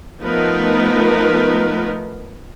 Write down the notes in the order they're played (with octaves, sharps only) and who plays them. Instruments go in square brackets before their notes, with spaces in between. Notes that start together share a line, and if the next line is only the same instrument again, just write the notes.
[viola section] F3 A3 B3 D#4 A#4 B4